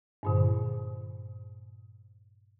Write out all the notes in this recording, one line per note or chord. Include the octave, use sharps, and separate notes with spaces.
G2 A#2 D3